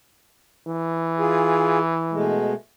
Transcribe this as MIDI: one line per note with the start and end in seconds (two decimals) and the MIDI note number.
0.67 2.45 52
1.19 1.79 65
1.19 1.79 68
2.12 2.54 47
2.12 2.54 56
2.12 2.54 57